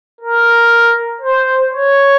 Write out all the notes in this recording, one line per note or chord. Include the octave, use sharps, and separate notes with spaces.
A#4
C5
C#5